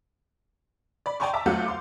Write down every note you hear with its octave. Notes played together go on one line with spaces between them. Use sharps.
D5 B5
D5 G5 G#5 A#5 C6 C#6
E5 A5 A#5 D6
D2 F#3 A3 F4 F#5 G6
F5 C6 D6